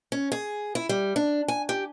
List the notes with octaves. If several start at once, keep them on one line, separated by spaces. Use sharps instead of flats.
C#4
G#4
E4
G3
D4
G#5
G4